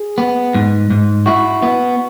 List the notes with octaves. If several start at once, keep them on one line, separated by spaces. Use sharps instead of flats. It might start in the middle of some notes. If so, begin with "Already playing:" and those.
Already playing: G#4
B3
G#2
G#2
E4 F#4
B3